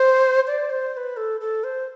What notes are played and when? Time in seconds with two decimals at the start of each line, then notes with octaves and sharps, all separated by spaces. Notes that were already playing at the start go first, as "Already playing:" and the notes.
Already playing: C5
0.47 D5
0.70 C5
0.93 C5
0.97 B4
1.17 A4
1.40 A4
1.64 C5